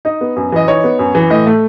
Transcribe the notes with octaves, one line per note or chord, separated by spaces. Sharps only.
D#4 D#5
B3
F#2
E3 D#5
D#4 C#5
B3
F#2
E3
A2 D#5
A3